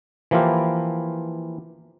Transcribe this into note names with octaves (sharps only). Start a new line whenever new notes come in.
E3 F3 A#3 E4 F4 G4